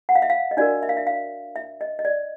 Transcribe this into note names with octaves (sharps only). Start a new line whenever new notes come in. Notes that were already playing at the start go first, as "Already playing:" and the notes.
F#5
F5
E5
F5
D#5
D4 F#4 A#4 D5
E5
F5
E5
F5
E5
D#5
D#5
D5